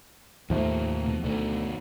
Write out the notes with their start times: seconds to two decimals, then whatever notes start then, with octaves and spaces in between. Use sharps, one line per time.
0.50 D#2 A2 F3 A3 A#3
1.06 B2
1.24 D2 B2 D#3 F#4